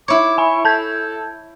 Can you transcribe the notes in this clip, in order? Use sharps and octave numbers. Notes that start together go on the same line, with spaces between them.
E4 C#5 D6
G#5 B5 C#6
A4 A5 G6 G#6